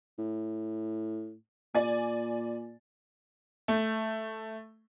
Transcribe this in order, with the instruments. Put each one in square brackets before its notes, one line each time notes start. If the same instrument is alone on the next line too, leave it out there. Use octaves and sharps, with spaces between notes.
[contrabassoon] A2
[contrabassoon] A#2 [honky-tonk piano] D5 G#5
[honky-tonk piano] A3